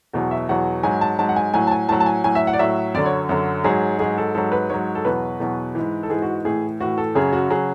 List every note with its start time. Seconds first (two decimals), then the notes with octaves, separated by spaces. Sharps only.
0.13 E2 B2 F#3 F#4
0.31 E5
0.49 E2 B2 F#3 F#5
0.83 G#2 F#3 G#5
1.01 A5
1.19 G#2 F#3 A5
1.29 F#5
1.36 G#5
1.54 A2 F#3 G#5
1.67 A5
1.71 G#5
1.89 A2 F#3 A5
2.00 A5
2.06 G#5
2.24 A2 F#3 G#5
2.35 E5
2.47 F#5
2.53 D5
2.59 A2 F#3 E5
2.94 F#2 D3 F#3 D5
3.06 C#5
3.29 F#2 D3 F#3
3.64 G#2 F#3 G#4
3.99 G#2 F#3 G#4
4.18 A4
4.35 G#2 F#3 A4
4.52 B4
4.70 G#2 F#3 C#5
4.95 A4
5.05 E2 B2 F#3 B4
5.40 E2 B2 F#3
5.75 G#2 E3
6.03 A4
6.10 G#2 E3 G#4
6.22 F#4
6.45 A2 E3 G#4
6.80 A2 E3 F#4
6.98 A4
7.15 F#2 C#3 F#3 G#4
7.33 F#4
7.50 C#3 F#3 G#4